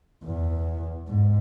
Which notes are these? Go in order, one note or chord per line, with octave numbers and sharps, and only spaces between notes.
E2
G#2